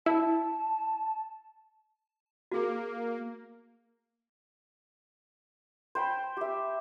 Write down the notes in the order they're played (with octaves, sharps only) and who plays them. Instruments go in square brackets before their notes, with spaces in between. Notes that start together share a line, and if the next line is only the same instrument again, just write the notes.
[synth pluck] E4 [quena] A5
[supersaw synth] A#3 [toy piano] F#4 G#4
[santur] C5 G5 B5
G4 E5